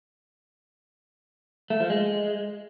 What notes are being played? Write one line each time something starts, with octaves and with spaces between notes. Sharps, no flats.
A3
F3
G#3